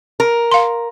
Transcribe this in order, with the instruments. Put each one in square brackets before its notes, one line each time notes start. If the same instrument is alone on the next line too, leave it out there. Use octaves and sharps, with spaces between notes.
[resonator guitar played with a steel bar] A#4
[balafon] F5 C6